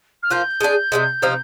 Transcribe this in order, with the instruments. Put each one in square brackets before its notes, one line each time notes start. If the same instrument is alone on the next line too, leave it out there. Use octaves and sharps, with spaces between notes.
[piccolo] F6
[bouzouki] F3 A#3 F4 [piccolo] G6
[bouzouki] G#3 D4 G#4
C3 F3 G#3
C3 F3 C4 D#4